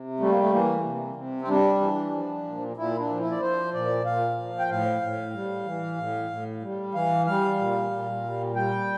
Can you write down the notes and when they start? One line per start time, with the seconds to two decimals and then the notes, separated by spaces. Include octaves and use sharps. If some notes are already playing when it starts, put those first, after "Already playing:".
Already playing: C3
0.20 G3 A3
0.30 A#3
0.40 A3
0.51 E3 A#3
0.84 C3
1.15 C3
1.42 C4
1.48 G3 D4
1.80 E3
2.13 F3
2.45 A#2
2.77 A#2 E4
2.99 D4
3.10 F3
3.20 E4
3.32 D5
3.40 F3 C5
3.74 A#2 D5
4.05 A#2 F5
4.37 F3
4.59 G5
4.69 A2 F5
5.02 A2
5.34 G3
5.66 E3
5.98 A2
6.30 A2
6.62 G3
6.94 E3 F5
7.26 G3 F5
7.59 A#2
7.91 A#2
8.24 G3
8.56 G3 G5